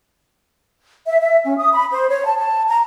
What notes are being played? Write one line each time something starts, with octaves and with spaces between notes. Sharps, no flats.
E5
E5
C#4
D#6
B5
C5
C#5
A5
A5
A#5